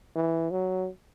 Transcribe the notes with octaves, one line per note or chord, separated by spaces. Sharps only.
E3
F#3